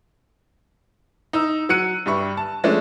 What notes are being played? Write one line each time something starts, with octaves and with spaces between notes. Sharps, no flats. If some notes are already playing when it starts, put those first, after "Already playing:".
D#4 E6
F#3 F#6 C#7 D#7
G2 G3 E5 C#6
A5
F3 G#3 A3 C#4 D4